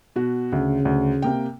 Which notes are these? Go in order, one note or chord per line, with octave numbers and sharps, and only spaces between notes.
B2 F#4
D2 C#3
D2
C3 A#3 G5